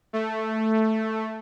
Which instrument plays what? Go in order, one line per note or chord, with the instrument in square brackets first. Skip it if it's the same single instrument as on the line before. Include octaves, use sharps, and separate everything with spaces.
[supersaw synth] A3